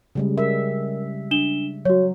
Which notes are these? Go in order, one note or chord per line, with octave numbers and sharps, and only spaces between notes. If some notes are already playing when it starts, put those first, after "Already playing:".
C#3 G3 G#3
A#4 E5
D4 E7 G7
F#3 F#4 C#5